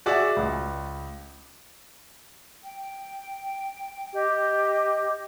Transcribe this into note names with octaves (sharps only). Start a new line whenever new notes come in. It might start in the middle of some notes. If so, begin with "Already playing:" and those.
F#4 G#4 D5 E5
C#2
G5
G4 D#5 D6